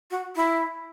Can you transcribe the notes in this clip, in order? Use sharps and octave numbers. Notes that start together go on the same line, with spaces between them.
F#4
E4